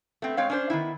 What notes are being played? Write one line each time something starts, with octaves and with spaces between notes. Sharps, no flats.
A3 B3 C4
G#3 C4 C#5 F5
C#4 D4 C5
D#3 B3 E4